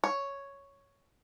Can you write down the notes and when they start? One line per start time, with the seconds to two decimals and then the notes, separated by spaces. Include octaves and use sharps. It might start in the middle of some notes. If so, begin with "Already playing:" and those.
0.04 C#5